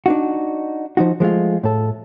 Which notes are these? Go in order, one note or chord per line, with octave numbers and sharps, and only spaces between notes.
D4 D#4 F#4
F3 D#4 F#4
F3 G#3 A3 F4
A2 A4